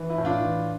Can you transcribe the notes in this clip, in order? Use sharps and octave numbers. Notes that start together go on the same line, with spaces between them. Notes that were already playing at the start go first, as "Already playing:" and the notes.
Already playing: E3
E4
A2
D4 F4
E3